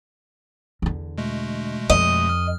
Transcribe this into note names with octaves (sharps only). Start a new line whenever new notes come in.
E2 D3
B2 G#3 A3
F2 D#5
F6